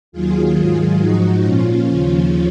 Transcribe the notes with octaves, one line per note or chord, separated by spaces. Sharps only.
D#2 D#3 F#3 F4 G#4
G#2 D#3 F#3
G#2 F3 D#4 F#4
A#2 F3 C#4 F4
D#2 C#3 F3